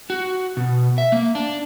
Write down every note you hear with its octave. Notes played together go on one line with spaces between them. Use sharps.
F#4
B2
E5
A#3
D4